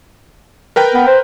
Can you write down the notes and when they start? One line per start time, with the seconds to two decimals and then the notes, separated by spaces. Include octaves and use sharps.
0.76 A#4 B4 G5
0.94 B3
1.07 C5